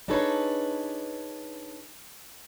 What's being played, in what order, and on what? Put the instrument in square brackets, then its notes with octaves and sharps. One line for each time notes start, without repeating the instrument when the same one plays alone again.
[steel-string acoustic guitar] D4 D#4 G#4 A4 B4 C#5